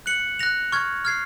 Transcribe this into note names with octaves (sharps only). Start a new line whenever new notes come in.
F#6 C#7 F#7
F#6 A#6 F7
C#6 F6 G#6
F6 G#6 C7